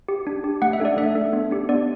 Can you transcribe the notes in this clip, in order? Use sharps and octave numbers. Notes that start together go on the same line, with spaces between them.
G4
D4
G4
A3 F#5
E5
D4 A4 D5
A3 E5
D4 A4
B3
D4 G4
B3 D5